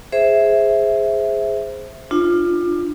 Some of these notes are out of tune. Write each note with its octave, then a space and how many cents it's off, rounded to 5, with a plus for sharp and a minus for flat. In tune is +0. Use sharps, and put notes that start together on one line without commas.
G#4 +0 C5 +0 E5 +0
D4 +25 F4 +0